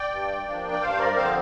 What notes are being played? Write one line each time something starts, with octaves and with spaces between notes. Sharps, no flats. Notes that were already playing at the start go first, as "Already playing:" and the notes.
Already playing: D5 G5
G2
F3 A#3 D4
D5
G2 C5 F5
A#4 D5
D3 F3 C4 C5 F5